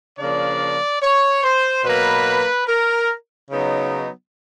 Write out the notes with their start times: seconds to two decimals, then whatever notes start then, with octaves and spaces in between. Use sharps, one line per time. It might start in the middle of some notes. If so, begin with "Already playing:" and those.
0.19 C#3 F3 A#3 D4 D5
1.02 C#5
1.43 C5
1.84 B2 F#3 A#3 B4
2.67 A#4
3.50 C#3 F#3 B3 D#4